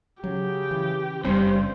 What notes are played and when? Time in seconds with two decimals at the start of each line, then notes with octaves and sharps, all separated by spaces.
0.24 C#3 F#3 G4
0.71 E3
1.24 F#1 G2 C#3 G3 C4 C5